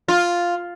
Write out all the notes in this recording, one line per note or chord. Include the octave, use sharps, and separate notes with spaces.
F4